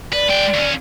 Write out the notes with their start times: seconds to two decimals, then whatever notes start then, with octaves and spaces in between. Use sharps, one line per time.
0.13 B4 D5
0.28 G#3 G5
0.54 D#2 C#4